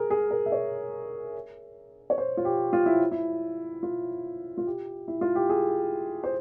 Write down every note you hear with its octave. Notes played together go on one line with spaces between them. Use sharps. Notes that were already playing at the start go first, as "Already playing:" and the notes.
Already playing: G#4 A#4
G#4
A#4
E5
C#5
C#5
C5
F4
G4
F4
E4
E4
F4
F4
G4
E4
F4
G4
G#4
C5